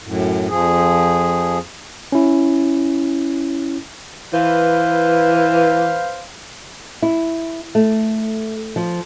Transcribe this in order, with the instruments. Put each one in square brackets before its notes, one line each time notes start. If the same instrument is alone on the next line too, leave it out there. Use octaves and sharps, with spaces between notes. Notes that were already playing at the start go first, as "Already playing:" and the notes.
[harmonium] F#2 A2
F2 F3 G#4
[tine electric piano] C#4 E4
[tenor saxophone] E3 [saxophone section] B4 C5 F5
[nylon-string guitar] E4
A3
F3